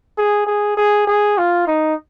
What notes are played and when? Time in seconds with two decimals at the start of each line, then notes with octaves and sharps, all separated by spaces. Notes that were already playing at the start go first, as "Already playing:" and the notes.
0.18 G#4
0.47 G#4
0.77 G#4
1.07 G#4
1.38 F4
1.67 D#4